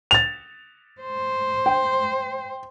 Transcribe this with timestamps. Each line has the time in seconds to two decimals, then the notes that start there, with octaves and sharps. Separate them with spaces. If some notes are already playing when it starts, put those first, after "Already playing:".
0.11 A6 F7
1.01 C5
1.66 G5